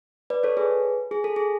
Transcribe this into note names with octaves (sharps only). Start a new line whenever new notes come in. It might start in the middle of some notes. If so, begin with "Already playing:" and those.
B4 D5
A4 C#5
G#4 B4
G#4
A4
G#4